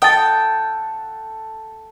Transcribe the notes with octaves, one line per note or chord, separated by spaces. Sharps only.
A4 F#5 G5 A5 D#6 A6